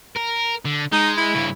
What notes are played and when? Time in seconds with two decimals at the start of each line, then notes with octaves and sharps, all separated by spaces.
0.16 A#4
0.65 D3
0.92 G#3 D#4
1.17 E4
1.35 G2 C#3